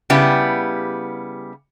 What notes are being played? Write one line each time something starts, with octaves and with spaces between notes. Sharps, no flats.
C#3 G3 B3 E4 G4